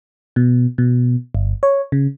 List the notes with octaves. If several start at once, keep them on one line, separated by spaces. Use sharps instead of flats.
B2
B2
G1
C#5
C#3